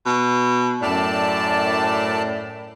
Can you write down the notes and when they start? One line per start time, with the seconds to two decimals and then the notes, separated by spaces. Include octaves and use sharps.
0.06 B2
0.82 F#2 A2 D5 A5